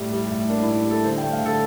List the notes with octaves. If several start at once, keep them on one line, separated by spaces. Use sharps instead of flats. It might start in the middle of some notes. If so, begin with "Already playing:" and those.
Already playing: A2 G3
G3
A2
A#3 D4
E4
A2
G3
A4
D3 C5
G5
A3
F5
D3 A4